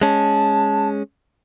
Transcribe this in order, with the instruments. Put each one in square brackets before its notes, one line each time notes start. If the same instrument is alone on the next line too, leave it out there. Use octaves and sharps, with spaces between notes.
[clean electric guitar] G#3 C#4 [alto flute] A5